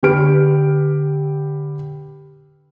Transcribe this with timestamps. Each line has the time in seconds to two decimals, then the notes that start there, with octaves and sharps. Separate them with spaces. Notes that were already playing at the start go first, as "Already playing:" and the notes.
0.03 D3 G4 B4 F6 D7